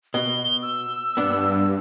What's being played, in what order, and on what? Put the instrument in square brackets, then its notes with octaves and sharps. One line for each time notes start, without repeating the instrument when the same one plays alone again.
[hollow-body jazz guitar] B2 [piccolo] G7
[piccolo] E6
[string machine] G2 [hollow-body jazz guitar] B3 D4